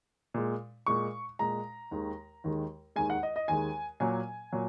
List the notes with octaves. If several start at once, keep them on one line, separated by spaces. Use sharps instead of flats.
A#2 G#3
A#2 G#3 C#6
A#2 G#3 A#5
D#2 D#3 G#3
D#2 D#3 G#3
D#2 D#3 G#3 G#5
F#5
D#5
D#5
D#2 D#3 G#3 G#5
A#2 F#3 A#3 G#5
A#2 F#3